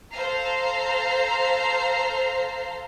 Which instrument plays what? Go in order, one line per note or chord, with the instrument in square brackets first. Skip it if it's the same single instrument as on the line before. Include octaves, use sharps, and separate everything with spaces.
[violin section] A4 C5 F5 A#5 C7